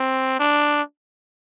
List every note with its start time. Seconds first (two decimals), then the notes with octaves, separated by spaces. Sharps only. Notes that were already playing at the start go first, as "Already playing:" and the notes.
Already playing: C4
0.39 D4